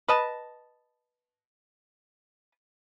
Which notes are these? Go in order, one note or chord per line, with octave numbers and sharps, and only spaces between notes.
B4 D#5 A5